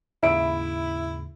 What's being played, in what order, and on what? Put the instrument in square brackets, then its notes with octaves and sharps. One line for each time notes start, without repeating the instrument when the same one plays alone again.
[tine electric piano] D#2 G#2 C#3 [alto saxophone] E4 [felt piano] E5 B5 D7